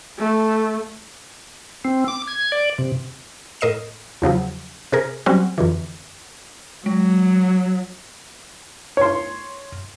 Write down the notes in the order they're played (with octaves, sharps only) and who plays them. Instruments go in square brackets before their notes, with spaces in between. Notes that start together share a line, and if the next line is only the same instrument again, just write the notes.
[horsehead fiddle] A3
[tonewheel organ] C4
D6
G#6
D5
C3
[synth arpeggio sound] A2 A#4 D#5 C7 E7
E2 C#3 F3 F#3
C3 G#4 A#4
F#3 G3 C4 C#4 F#4
F2 D3 E3
[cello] F#3 [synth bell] G#3
[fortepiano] C#5 C6